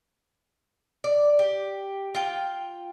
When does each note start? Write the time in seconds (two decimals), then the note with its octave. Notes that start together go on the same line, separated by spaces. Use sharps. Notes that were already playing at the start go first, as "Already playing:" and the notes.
1.04 D5
1.39 G4
2.15 F4 G5